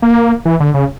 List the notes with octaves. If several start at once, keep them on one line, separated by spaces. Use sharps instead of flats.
A#3
E3
D3
C#3